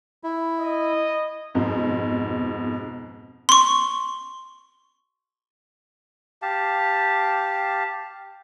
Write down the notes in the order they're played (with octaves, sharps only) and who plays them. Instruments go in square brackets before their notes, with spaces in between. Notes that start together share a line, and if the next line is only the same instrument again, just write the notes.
[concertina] E4
[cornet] D#5
[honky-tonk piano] F2 G#2 B2
[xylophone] C6 C#6
[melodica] G4 F5 A5